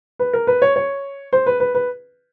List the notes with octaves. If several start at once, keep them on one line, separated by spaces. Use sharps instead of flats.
B4
A#4
B4
C#5
C#5
C5
B4
B4
B4